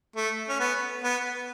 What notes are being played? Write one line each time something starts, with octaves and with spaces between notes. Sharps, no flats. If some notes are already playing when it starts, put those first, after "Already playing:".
A3
C#4
B3
B3